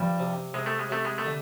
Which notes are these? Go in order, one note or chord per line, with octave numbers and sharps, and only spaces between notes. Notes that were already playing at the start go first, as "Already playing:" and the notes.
Already playing: G2 F3 G3
C3
C3 G#3
A3
G#3
C3 A3
G#3
A3
D3